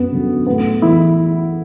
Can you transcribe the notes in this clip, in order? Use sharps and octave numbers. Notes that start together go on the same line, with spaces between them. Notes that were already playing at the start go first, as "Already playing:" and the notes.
Already playing: F#2 B3
D3 F#3
A2 B3
E3 E4